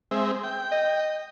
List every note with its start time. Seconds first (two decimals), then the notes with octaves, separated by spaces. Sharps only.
0.11 G#3 C4 E5
0.44 G5
0.72 D#5